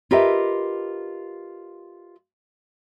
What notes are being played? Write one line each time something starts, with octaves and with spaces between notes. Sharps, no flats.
F4 G4 A#4 B4 D#5 E5